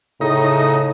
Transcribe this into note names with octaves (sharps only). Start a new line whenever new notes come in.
A2 C#3 D#4 A#5